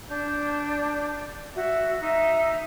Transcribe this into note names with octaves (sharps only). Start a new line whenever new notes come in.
D4 G6
F#4 E5
D#4 E5